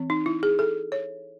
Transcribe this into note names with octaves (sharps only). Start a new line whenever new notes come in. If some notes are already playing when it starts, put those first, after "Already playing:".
Already playing: E3 C4
D#4
E4
G#4
A4
C#5